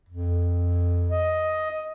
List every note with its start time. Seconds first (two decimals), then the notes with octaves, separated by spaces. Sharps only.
0.09 F2
1.11 D#5